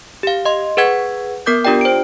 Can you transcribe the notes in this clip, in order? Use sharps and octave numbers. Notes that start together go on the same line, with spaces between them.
G4 F5
D#5 C6
G#4 B4 F#5 G#6
B3 A#4 D6 G6
D4 F4 G4 D5 G5
C5 D7